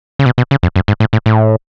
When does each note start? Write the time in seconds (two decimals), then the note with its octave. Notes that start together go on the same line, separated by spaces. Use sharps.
0.19 C#3
0.26 B2
0.38 B2
0.51 C#3
0.63 F2
0.76 F#2
0.88 G#2
1.00 A2
1.13 A2
1.26 A2